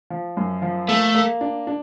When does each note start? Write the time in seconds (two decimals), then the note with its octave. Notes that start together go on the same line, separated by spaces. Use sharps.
0.10 F3
0.37 F#2
0.62 F3
0.88 A3 A#3
1.15 A#3
1.41 D4
1.67 D4